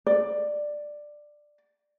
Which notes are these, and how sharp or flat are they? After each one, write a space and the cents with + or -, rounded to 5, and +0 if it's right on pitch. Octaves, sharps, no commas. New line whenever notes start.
D5 +10